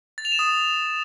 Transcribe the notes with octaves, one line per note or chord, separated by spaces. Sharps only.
A6
F7
E7
D#6